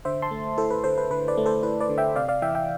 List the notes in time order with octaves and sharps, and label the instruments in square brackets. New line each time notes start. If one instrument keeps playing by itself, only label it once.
[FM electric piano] D3 C5 E5
A5 C6
A3
E4 A4 C5
B4
D3 A4 C5
B4
D3 B4
B4 D5
A3
A4 C5
E4 B4
B4 D5
D3
E5 G5
C3 D5 F5
D5 F5
E3 E5 G5
E5 G5